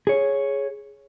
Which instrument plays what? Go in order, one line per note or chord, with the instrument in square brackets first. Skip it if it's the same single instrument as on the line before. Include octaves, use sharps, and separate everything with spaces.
[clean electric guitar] G#4 C#5